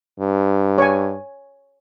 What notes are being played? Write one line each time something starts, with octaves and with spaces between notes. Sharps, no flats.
G2
C#5 G#5